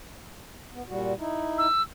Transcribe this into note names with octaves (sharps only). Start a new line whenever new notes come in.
B3
A#2 G3 F#4
D#4 E4
E6